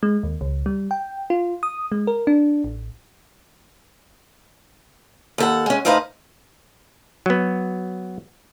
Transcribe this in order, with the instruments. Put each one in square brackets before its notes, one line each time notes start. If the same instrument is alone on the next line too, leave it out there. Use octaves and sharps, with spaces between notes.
[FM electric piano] G#3
D#2
C#2
G3
G5
F4
D#6
G#3
A#4
D4
A1
[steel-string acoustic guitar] D#2 A4 F#5
G#3 C#4
A2 C#3 D#4 B4 C5 F5
[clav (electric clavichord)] F#3 B3